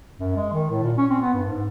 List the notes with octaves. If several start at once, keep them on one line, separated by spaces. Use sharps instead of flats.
F#2
G#3
D#3
A2
A#2
C#4
C4
B3
G2
G#2